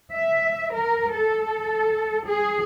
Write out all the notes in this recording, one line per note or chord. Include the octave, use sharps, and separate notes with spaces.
E5
A#4
A4
G#4